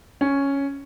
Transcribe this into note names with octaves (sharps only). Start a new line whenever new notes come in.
C#4